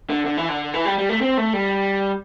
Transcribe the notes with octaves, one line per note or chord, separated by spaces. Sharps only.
D3
D3
E3
D3
E3
G3
G3
A3
C4
A3
G3